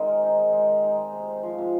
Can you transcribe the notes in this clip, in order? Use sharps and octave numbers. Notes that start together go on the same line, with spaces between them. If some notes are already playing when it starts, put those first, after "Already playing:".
Already playing: D#3 G#3 C4
A#4
D#4
G#3
G#3
A#4
D#4
G#3
C3
C4
F3
C3